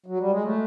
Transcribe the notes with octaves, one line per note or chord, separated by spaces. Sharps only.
F#3
G3
G#3
A3